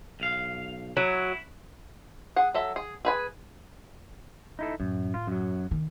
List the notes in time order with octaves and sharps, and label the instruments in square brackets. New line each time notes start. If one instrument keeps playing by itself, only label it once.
[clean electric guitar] B1 F5
[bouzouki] F#3 [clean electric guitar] E4
[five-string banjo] G#4 F#5
F#3 A4 E5
G#4
G#4 B4 G#5
[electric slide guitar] D#4 E4 A4
[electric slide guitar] F#2 [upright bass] A2
[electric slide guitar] F4
F#2 F#3
[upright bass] D#3